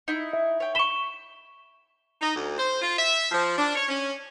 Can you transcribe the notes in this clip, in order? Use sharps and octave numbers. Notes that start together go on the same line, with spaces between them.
D#4 E4
E5
C#5 G5
B5 C#6 E7 G7
D#4
D2
C5
F4
E5
F3
D4
C#5
C#4